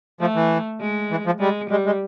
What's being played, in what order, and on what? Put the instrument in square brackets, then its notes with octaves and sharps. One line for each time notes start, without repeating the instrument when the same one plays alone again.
[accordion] F3 [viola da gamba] A3
[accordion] E3
[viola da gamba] G#3
[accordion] E3
F3
[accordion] G3 [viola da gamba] G#3
[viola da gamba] G3 [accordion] G#3
[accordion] G#3